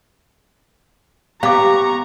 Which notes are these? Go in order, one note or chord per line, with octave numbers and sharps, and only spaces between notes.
B3 G4 F5 A#5 C#6 D6